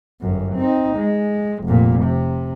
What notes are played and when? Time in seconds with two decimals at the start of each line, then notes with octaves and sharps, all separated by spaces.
0.21 G1 F#2
0.55 C4 D#4
0.97 G#3
1.64 F1 A#2
2.04 C3